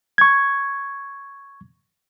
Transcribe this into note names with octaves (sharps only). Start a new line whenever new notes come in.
C#6 G#6